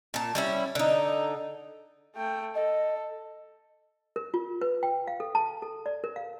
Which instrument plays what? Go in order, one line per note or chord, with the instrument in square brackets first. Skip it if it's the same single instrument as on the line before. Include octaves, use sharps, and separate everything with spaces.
[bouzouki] A#2 A5
G3 C#4 E4
D3 D#4
[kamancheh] A3 G5
[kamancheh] A4 [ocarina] D#5
[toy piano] A#4
F4
B4
G5
F5
A4
A5
A4
D5
A#4
F5